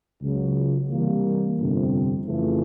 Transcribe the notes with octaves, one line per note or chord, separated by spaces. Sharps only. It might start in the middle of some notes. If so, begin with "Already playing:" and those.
C#2 C#3 F#3
C3 E3 G3 A#3
G1 F2 C3
F2 C#3 E3 A3